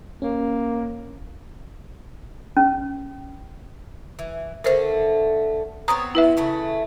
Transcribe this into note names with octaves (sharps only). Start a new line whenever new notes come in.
A#3 C#4
C#4
E3
D3 A3 A#4 C5
B3 C4 C#5 A#5 D#6
E4 B4 E5
C#3 E3 A3